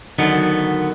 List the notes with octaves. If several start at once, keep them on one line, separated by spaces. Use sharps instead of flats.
D3 D#3 F#3 B3 D#4